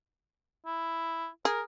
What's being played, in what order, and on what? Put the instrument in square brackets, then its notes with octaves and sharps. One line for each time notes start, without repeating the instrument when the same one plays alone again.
[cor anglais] E4
[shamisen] G#4 [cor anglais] A#4